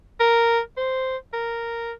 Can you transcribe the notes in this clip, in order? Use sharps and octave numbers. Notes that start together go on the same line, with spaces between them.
A#4
C5
A#4